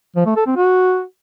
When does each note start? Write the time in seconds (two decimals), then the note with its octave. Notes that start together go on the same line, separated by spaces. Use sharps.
0.16 F3
0.26 A3
0.36 A4
0.46 C4
0.57 F#4